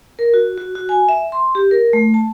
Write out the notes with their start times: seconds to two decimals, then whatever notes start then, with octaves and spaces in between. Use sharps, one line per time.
0.19 A#4
0.34 F#4
0.58 F#4
0.75 F#4
0.89 G#5
1.09 E5
1.32 C6
1.55 G4
1.71 A#4
1.93 A3
2.14 A5